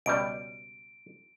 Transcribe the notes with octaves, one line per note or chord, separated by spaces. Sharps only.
C#2 B2 G3 D7